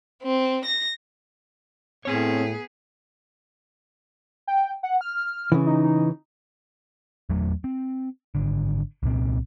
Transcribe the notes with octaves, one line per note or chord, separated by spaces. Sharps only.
C4
A#6
A2 B3 C4 G#4 C#5
G5
F#5
F6
C#3 E3
D#4
E2 F#3 A3
C4
G#1 D3
C2 A#2 C4